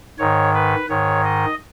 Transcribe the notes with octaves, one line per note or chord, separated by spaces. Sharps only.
G#2 D#3 C#5
B4
G#2 D#3 C#5
D#5